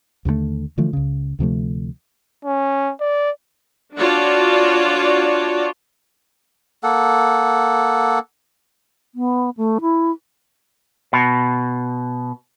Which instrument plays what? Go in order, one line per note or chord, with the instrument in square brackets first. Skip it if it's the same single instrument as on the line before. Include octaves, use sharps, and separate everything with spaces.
[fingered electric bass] D#2 D3 E3 A3
D3 E3 F3 A3
C#2 C#3
D2 C3 F3 A3
[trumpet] C#4
D5
[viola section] D4 F4 F#4 C#5 D5 A5
[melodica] A#3 A4 F#5
[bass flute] B3
A3
E4
[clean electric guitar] B2